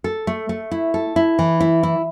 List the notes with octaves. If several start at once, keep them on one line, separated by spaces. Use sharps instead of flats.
A4
A3
A3
E4
A4
E4
E3
E4
E4